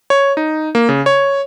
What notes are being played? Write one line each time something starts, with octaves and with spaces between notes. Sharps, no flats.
C#5
D#4
A#3
C#3
C#5